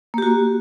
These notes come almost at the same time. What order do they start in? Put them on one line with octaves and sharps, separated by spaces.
A#3 G4 F#4